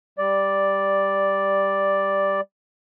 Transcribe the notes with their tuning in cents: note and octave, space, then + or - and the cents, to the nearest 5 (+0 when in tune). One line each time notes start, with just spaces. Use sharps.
G3 +5 D5 +0